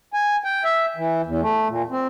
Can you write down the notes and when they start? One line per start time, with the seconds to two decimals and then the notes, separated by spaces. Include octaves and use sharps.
0.13 G#5
0.44 G5
0.64 E5
0.96 E3
1.26 E2
1.42 A3
1.68 A#2
1.90 C4